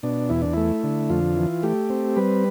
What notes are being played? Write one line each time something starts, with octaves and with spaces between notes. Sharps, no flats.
B2 D4
E2 E4
D4
A3 E4
D3
F2 F4
E3
A3 G4
C4
G3 B4